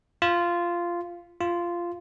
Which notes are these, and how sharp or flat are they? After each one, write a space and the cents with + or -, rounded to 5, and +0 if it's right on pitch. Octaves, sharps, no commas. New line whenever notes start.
F4 -10
F4 -10